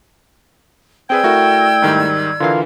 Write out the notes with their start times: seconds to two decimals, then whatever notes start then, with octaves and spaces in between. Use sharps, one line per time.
1.10 C4 G#4 B4 D5 G5 E6 G#6
1.24 A3 E4 F#4 A#4
1.82 G#2 D#3 G3
2.40 D3 E3 F4 A#4 F5